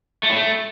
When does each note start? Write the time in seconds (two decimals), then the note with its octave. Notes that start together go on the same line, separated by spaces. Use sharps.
0.23 A3
0.30 A2
0.36 A3